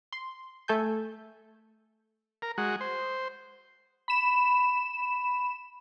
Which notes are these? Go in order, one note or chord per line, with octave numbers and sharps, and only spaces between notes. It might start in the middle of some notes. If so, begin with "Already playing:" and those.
C6
A3 A4 G#5 G6
A#4
G#3 F#4
C5
B5 E7